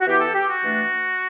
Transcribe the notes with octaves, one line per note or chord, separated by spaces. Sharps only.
F#4
E3 B3 E4 G4
A4
G4
F#4
E3 A3 D4